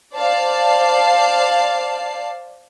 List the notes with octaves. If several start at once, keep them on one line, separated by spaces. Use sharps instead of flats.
C5 D5 F5 A5 C7